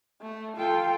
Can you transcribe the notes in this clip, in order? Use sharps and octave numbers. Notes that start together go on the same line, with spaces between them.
A3
F4 A4 G5